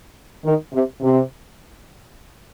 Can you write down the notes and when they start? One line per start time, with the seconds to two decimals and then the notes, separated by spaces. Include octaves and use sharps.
0.45 D#3
0.73 C3
1.01 C3